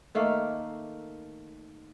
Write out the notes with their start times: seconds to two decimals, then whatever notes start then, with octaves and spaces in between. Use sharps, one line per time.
0.15 D#3 A3 A#3 F5